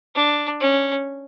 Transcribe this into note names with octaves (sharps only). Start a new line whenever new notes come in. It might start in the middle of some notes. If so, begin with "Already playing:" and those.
D4
C#4